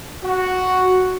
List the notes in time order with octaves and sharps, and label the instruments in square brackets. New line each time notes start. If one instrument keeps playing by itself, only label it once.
[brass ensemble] F#4